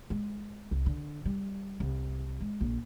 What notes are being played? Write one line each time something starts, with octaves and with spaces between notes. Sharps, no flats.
G#3
C2
D3
G3
C2
G#3
A#1